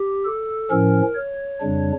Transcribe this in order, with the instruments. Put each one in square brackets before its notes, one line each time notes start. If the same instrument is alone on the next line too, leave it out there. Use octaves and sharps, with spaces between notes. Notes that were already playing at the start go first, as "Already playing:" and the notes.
Already playing: [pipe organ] G4
A4
A2 F3 C#4 A#4
C#5
F2 C#3 G3 D4